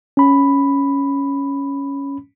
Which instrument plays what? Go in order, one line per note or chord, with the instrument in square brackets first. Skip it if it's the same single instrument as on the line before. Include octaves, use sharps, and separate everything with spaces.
[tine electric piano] C#4 B5